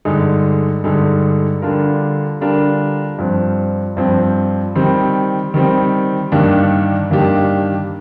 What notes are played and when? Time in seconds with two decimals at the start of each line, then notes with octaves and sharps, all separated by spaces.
0.05 G2 D3 G#3 D#4
0.84 G2 D3 G#3 D#4
1.62 D3 G3 D4 F4 A#4
2.40 D3 G3 D4 F4 A#4
3.18 G2 F3 C4
3.97 G2 F3 C4
4.76 D#3 G3 C4
5.54 D#3 G3 C4
6.32 G2 D#3 A#3 D4 G4
7.10 G2 D#3 A#3 D4 G4